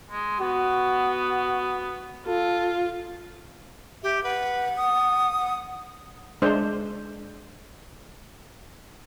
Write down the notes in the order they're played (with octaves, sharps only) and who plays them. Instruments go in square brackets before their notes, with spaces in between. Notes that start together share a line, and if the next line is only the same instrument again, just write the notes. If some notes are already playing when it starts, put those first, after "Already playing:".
[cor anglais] G#3
[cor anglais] B3 [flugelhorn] F#4
[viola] F4 [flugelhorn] A4
[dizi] G4 [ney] E5
[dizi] B4 [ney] F#5
[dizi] D#6
[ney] F#5
[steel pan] G#3 D4 C5